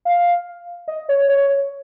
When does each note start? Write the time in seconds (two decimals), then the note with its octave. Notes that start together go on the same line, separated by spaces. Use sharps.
0.05 F5
0.88 D#5
1.09 C#5
1.29 C#5